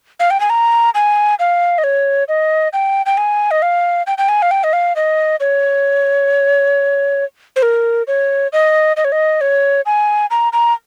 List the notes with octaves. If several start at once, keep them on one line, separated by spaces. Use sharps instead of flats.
F5
G5
G#5
A#5
G#5
F5
D#5
C#5
D#5
G5
G5
G#5
D#5
F5
G5
G5
G#5
F5
G5
D#5
F5
D#5
C#5
C5
A#4
C#5
D#5
D#5
C#5
D#5
C#5
G#5
A#5
A#5